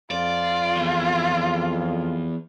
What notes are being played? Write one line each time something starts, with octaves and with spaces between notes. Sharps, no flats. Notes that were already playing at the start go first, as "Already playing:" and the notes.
F2 F4 D5
E2